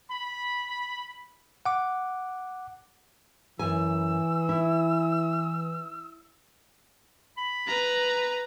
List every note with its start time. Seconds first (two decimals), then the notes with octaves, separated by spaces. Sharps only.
0.10 B5
1.66 F#5 D6
3.59 F#2 E3 G#5 E6
4.49 E4
7.37 B5
7.68 B4 A#5